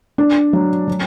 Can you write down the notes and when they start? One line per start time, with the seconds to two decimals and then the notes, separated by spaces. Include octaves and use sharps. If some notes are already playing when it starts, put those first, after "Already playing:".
0.18 D4
0.53 F#3
0.88 F#3